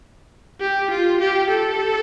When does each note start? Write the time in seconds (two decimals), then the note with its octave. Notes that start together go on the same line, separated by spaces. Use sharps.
0.61 G4
0.90 F4
1.20 G4
1.49 A4